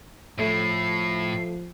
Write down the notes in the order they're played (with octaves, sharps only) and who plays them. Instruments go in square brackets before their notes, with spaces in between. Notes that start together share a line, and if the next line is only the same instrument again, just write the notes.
[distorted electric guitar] A2 [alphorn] F3 [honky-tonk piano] A3 [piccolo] C7